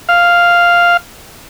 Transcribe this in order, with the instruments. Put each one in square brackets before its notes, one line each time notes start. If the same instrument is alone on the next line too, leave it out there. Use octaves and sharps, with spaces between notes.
[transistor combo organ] F5